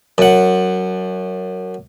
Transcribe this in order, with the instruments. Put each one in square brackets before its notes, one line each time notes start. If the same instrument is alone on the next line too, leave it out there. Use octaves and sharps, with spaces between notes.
[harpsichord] F#2 F#5